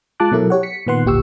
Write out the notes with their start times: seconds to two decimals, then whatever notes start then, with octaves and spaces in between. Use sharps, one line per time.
0.20 G#3 F4 A5 D6 F#6
0.32 B2 F#3 E4 A4 A#4
0.50 G4 C#5 F#5
0.63 B6 C#7
0.86 A#2 D#3 B3 F#5 C6
1.05 G#1 D2 A#2 G4 C#6 E6